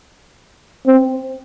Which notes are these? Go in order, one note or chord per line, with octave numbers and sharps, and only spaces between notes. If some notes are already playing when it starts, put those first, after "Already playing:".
C4